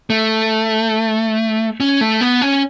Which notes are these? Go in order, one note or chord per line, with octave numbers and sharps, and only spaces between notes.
A3
C#4
A3
B3
C#4